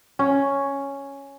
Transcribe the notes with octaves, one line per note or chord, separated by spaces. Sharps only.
C#4